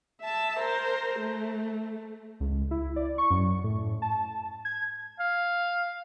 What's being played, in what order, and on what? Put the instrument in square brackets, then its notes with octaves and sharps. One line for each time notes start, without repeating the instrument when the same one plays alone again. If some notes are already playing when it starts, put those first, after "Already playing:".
[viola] E5 A5
A#4 C5
A3
[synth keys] C#2
E4
D5
C#6
F#2
A2
A5
G#6
[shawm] F5